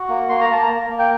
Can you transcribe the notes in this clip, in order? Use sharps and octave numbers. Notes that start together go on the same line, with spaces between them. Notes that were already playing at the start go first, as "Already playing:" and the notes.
Already playing: F#4
A#3
A#3 C6
A#5
A#3 A5
A#5
A#3
A#3
G5